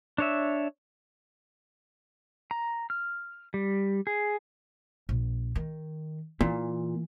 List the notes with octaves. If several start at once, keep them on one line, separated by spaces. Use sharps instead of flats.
D4 C#5 E5
A#5
F6
G3
G#4
A#1
D#3
A#2 E3